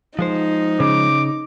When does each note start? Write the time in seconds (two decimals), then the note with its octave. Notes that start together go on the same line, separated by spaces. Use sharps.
0.19 F3 G#3 D#4 C5
0.80 C#3 D6